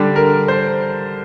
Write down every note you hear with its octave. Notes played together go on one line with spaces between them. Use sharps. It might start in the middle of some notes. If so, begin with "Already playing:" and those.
Already playing: D3 G3 D4
A#4
C5